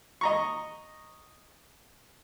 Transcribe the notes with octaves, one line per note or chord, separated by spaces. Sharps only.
D#5 A#5 C#6